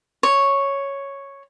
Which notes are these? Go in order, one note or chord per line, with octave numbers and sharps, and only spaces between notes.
C#5